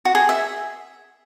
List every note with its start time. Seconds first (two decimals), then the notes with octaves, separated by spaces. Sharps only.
0.05 F#4
0.15 G#4
0.29 E5